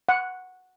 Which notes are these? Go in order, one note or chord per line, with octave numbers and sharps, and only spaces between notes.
F#5